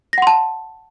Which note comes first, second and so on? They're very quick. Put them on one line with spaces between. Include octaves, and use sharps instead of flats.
A#6 F#5 C6 A5